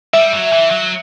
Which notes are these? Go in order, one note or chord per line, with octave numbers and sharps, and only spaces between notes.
G3 E5
F#3
E3
F#3